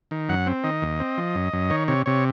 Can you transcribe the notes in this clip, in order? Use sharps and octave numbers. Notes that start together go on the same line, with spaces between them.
D#3
F#2 F#5
C4
D#3 D#5
D#2
C4
F3
F#2
F#2
D#3 C#5
C3 C#5
C3 C#5